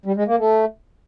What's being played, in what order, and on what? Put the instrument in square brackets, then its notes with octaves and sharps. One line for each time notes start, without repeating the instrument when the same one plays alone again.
[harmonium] G3
G#3
A#3
A3